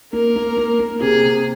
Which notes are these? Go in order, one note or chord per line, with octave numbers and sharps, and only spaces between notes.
A#3 A#4
A#3
A#3
A#3
C3 G#4
C3